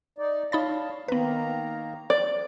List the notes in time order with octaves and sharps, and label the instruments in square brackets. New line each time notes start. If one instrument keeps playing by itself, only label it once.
[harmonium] D#4 D5
[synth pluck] D#4 B5 A6 [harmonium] C#5 F5 A5
[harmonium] D#3 A#3 A#5 [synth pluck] B3 B4
[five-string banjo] D5